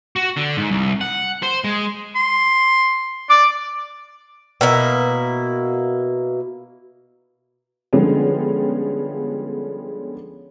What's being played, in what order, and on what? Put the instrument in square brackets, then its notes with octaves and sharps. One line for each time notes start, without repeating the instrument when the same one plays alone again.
[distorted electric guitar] F#4
D3
G#2
C2
F#5
C5
G#3
[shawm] C6
[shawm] D5 [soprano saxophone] D6
[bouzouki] B2 A#3 E4
[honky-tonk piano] D3 F3 G3 G#3 B3 C#4